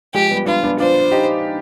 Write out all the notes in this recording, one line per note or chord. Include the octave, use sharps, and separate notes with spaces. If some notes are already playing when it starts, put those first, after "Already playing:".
F3 G#3 G4
G3 B3
B3 D4 F4
B3 D4
D4 F4 C5
D#4 G4